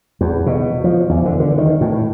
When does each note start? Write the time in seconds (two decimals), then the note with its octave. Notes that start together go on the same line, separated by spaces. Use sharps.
0.21 E2
0.46 B2
0.84 F3
1.09 E2
1.25 D3
1.40 D3
1.58 D#3
1.81 A2